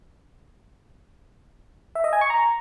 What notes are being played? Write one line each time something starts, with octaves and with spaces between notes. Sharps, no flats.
E5
D#5
G#5
C#6
A#5